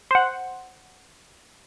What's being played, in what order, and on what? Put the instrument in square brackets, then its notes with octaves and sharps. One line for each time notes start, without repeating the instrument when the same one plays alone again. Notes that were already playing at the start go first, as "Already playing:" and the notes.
[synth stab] C5 F#5